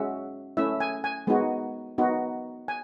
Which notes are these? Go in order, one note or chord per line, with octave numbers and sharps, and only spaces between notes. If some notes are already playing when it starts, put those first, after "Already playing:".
Already playing: G#3 C#4 F#4 E5
A3 C#4 E4 E5
G#5
G#5
G#3 B3 D#4 F#4
B3 D#4 F#4
G#5